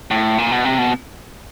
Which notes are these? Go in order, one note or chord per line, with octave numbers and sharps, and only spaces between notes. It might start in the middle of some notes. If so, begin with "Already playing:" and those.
A2
A#2
B2
C3
B2